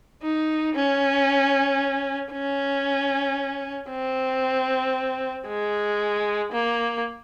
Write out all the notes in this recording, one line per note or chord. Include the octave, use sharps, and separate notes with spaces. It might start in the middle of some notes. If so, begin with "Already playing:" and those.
D#4
C#4
C#4
C4
G#3
A#3